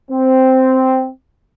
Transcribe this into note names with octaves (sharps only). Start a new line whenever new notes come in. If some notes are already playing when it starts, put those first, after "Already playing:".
C4